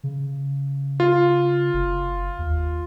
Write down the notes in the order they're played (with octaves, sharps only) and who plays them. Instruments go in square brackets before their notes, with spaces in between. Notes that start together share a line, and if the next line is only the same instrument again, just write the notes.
[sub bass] C#3
[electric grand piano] F4
[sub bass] F#1
D#2